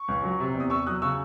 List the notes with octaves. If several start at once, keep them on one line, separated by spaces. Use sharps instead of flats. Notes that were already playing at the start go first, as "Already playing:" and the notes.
Already playing: C#6
C#2
F#3
C3
E2
D#6
E2 C#6 E6
F#3 D#6 F#6
C#3 C#6 E6